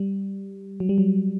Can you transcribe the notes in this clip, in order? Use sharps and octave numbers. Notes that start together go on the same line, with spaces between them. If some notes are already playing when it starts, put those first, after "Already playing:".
Already playing: G3
F#3
G3
F#3